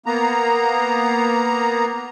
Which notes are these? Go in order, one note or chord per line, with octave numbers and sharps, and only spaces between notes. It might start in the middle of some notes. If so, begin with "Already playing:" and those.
A#3 B3 A#5